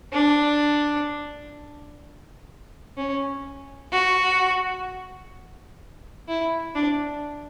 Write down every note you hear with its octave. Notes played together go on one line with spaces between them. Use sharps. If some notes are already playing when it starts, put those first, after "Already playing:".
D4
C#4
F#4
E4
D4